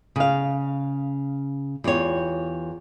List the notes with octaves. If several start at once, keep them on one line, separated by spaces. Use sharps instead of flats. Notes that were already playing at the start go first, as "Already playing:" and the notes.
C#3 F5
E2 F4 G4 C#5